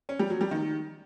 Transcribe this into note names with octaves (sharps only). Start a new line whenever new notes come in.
C#4
G3
F#3
G3
D#3